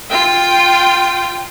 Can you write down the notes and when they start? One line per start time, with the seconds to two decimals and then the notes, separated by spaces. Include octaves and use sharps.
0.10 F4 G5